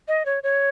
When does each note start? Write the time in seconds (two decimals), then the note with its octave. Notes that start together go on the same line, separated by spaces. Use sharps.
0.08 D#5
0.25 C#5
0.43 C#5